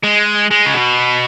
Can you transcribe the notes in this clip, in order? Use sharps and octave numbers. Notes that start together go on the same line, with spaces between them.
G#3
G#3
C#3
B2